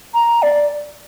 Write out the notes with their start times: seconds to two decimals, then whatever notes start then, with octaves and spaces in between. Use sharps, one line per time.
0.14 A#5
0.42 D5